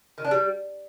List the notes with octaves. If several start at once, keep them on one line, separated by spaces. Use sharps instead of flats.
D#3
D4
G3